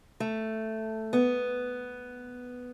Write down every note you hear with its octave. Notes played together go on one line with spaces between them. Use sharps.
A3
B3